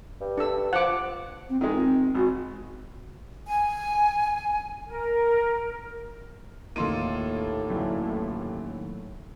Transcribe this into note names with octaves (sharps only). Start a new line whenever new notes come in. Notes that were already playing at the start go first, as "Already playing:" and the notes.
G2
D4 A4 E6
F3 F#5 D6
C4
D#3 G#3 F4
C4
G#1 F#4
G#5
A#4
D#2 A2 A#3 D#4 F4 A4 C6 D#7
F#2 D3 E3